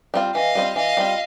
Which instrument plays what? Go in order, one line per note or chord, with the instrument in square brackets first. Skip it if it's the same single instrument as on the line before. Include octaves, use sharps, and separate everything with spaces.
[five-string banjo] G3 C4 F4
[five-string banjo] E3 [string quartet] D#5 F5
[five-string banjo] G3 C4 F4
[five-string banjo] E3 [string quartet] D#5 F5
[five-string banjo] G3 C4 F4